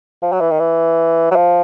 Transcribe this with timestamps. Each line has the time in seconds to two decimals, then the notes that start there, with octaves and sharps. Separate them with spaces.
0.22 F3
0.32 F#3
0.41 E3
0.51 D#3
0.60 E3
1.31 F#3
1.36 F3